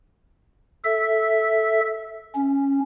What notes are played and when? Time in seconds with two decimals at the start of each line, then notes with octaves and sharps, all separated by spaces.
0.85 A4 E5
2.35 C#4